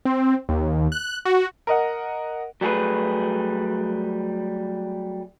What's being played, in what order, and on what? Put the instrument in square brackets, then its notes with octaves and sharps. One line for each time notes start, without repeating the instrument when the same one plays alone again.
[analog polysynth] C4
D#2
F#6
F#4
[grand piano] A#4 D#5 F#5
[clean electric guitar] F#3 G3 A3 F#4 G#4 B4